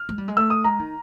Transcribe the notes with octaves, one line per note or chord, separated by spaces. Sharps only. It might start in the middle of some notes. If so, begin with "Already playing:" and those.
Already playing: F6
G#3
G3
G#3
A3 E6
D#6
G#3 A#5
D#3